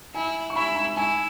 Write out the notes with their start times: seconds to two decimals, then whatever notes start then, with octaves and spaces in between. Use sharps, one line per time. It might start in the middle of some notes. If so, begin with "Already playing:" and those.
0.15 E4 G#5
0.50 C#6
0.56 E4 B5
0.76 B5
0.96 E4 G#5